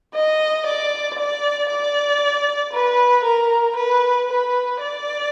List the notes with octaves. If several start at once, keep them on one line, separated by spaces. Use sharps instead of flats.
D#5
D5
D5
D5
B4
A#4
B4
B4
D5